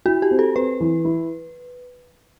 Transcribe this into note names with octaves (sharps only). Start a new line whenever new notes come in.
E4 F#4
G4
C4
A4
C4 B4
E3
E4